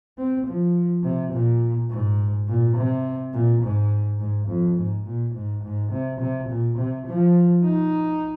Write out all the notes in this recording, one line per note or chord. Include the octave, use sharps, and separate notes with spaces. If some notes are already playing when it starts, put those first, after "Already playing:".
C4
F3
C3
A#2
G#2
A#2
C3
A#2
G#2
G#2
F2
G#2
A#2
G#2
G#2
C3
C3
A#2
C3
F3
D#4